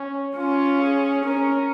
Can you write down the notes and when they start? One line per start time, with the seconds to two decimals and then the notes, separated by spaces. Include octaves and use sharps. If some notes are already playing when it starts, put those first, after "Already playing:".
Already playing: C#4
0.36 C#4 F4
0.81 G#4
1.25 C#4 A#4